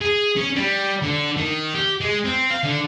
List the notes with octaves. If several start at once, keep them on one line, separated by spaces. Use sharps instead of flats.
G#4
C#4
G3
D3
D#3
G4
G#3
C4
F5
D3